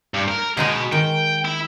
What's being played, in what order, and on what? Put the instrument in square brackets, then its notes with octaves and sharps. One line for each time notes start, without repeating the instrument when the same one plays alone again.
[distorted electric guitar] G2
A#4
[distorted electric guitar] B2 [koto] G#3 D#4 G#4
[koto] D#3 [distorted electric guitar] G5
[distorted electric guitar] E4